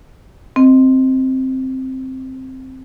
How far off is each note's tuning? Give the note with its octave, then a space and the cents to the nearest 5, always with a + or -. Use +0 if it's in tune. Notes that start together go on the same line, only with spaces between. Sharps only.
C4 +0 D#5 +10